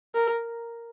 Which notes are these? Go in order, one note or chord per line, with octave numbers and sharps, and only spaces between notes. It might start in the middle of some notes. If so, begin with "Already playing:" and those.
A#4